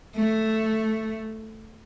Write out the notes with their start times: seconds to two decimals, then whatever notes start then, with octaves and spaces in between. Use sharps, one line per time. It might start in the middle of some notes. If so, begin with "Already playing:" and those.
0.17 A3